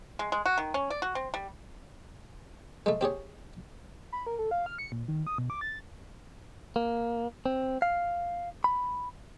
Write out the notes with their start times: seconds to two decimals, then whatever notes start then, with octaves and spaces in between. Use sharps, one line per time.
0.19 G#3
0.32 G#3
0.46 F#4
0.58 D#3
0.74 C#4
0.90 D5
1.02 F#4
1.15 C4
1.34 G3
2.86 G#3 A3
3.01 C4 G4 G#4 C#5
4.12 B5
4.27 A#4
4.39 A4
4.51 F5
4.66 F6
4.78 C#7
4.92 A#2
5.08 D#3
5.27 D#6
5.38 B2
5.50 D6
5.61 A6
6.76 A#3
7.46 C4
7.82 F5
8.64 B5